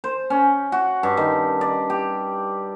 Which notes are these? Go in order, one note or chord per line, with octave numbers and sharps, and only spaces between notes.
C5
C#4
F#4
G2
D#3
D5
G4